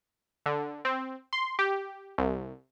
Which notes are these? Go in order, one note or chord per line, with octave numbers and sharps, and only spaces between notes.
D3
C4
C6
G4
C2